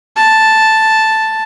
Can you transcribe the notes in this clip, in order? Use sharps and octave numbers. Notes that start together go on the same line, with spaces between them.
A5